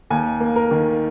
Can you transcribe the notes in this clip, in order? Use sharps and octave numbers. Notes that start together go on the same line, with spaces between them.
D#2 G#5
A#3
A#4
D#3